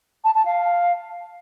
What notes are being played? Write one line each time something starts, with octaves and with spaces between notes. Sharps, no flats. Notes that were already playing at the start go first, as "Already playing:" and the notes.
A5
A5
F5